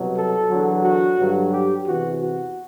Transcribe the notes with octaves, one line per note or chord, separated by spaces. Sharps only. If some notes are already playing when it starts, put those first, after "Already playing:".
Already playing: C2 B2 F#3
A4
E2 D3 F#3
F#4
G2 D3 F#3
G4
E2 C3 E3 F#4
F#4